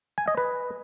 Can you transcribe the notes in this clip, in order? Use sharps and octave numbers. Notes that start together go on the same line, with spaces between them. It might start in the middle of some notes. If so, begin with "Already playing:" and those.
G#5
D#5
B4